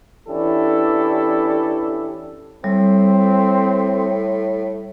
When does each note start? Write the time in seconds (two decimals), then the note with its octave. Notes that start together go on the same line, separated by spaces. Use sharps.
0.29 E3 C#4 D4 E4 G4 A4
2.64 A2 G3 C4